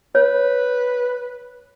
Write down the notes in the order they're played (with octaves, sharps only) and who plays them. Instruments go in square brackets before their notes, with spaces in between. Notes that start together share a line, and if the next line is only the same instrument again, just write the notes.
[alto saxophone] B4 [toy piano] C#5